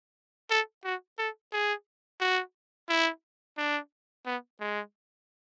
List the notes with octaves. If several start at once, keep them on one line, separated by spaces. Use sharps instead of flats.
A4
F#4
A4
G#4
F#4
E4
D4
B3
G#3